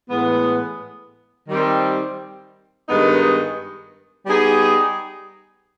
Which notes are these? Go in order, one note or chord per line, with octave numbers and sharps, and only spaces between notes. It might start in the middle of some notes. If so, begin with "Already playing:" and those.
A2 E3 G#3 B3
D#3 G3 C4
G2 D#3 G#3 B3 D#4
G3 B3 D#4 G#4